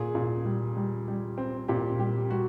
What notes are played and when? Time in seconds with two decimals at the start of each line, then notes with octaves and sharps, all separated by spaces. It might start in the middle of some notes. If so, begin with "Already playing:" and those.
Already playing: A#2 G#4
0.15 A#2
0.45 G3
0.77 G3
1.08 G3
1.38 C4
1.68 A#2 G4
1.99 G3 G4
2.31 G3 F#4